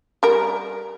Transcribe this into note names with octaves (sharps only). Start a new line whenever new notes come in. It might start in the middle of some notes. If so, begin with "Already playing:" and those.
G3 A#4